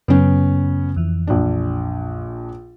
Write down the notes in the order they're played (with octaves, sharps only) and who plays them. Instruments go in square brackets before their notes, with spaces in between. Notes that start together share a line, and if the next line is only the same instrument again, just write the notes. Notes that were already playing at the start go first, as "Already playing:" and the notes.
[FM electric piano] F#2 C#3 F#3 [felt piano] B3 C#4
[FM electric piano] F2 E3
[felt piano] A#1 D4